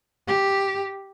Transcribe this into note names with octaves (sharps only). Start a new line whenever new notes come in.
G4